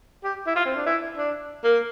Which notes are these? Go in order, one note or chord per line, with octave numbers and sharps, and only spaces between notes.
G4
E4
F4
C4
D4
E4
D4
A#3